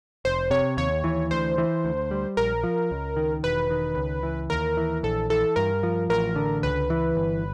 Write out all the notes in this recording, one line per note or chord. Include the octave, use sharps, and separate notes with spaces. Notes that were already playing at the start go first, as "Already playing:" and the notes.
F1 C5
C3 C#5
D#2 C#5
E3
D2 C5
E3
D2
G3
A#1 A#4
F3
C#2
D#3
E1 B4
D#3
C#2
E3
D#2 A#4
E3
A#1 A4
E3 A4
G2 A#4
F3
A1 A#4
D3
C#2 B4
E3
G1